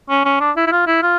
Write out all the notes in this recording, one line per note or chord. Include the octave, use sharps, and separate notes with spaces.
C#4
C#4
D4
E4
E4
F4
E4
F4